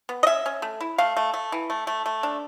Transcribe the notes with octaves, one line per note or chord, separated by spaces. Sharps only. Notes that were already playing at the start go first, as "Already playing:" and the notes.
B3
D#5
C#4 E5
C#4
A3
E4
A3 F5
A3
A3
E3
A3
A3
A3
D4